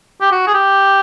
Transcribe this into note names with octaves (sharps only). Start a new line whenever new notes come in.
G4
F#4
G#4
G4